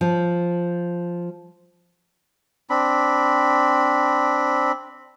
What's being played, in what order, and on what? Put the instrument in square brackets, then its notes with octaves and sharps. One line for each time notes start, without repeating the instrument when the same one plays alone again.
[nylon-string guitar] F3
[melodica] C4 D4 B5